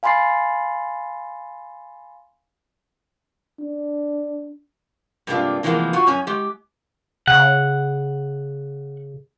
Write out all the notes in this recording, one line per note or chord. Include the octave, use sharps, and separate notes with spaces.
F5 G#5 B5 C6 A6 C7
D4
G2 C3 G#3 A#3 D4 F4
C3 E3 F3 G#3 A#3 B3
F4 F#4
F#2 C#4 G#5
G#3 G4
C#3 F#5